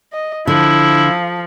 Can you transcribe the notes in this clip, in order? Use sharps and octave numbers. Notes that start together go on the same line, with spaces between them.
D#5
D3 F3 E4